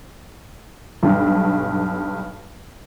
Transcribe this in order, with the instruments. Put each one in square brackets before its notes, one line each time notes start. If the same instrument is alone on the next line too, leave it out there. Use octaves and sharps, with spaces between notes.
[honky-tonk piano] B1 G2